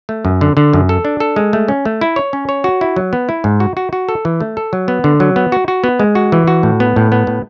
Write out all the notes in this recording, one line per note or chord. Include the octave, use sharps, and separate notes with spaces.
A3
F#2
D3
D3
F#2
A4
D4
A4
G#3
A3
C#4
A3
E4
C#5
C#4
C#5
F#4
E4
F#3
B3
E4
G#2
F#4
F#4
F#4
A4
E3
A3
A4
F#3
B3
D3
F#3
B3
F#4
F#4
B3
G#3
F#4
E3
F#4
A2
B3
A2
B3
A2